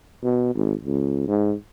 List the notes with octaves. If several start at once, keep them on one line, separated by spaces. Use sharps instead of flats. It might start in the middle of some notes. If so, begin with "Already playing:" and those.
B2
G#1
C#2
G#2